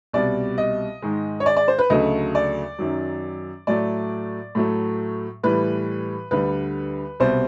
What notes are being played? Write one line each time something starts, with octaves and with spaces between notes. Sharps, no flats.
C2 B2 G3 D5
D#5
G#2 D#3 G#3
C#5
D5
D5
C5
B4
D2 C#3 F#3 A3 D#5
D5
F#2 D#3 F#3
A2 F#3 A3 D5
A2 F#3 A3
A2 E3 G3 B4
D2 D3 G3 B4
C2 B2 G3 C5